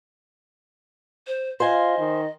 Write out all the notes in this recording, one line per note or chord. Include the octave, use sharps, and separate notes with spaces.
C5
F4 C5 D#5 G#5
D#3